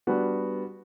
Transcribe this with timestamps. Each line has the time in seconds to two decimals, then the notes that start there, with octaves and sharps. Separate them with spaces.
0.07 G3 B3 D4 F#4